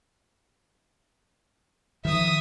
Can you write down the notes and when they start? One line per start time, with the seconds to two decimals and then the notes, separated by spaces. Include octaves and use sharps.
2.05 D#3 F3 E5 D#6